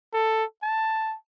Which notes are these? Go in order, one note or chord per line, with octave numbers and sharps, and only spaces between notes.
A4
A5